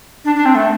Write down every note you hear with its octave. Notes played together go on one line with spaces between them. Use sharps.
D4
D4
C4
A3